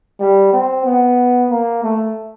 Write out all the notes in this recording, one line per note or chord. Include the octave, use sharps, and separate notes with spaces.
G3
C4
B3
A#3
A3